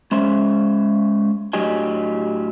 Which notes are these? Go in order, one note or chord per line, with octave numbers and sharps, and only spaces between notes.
G#3 C#4 C5 E5
A2 F#3 D4 G4 D#5 G#5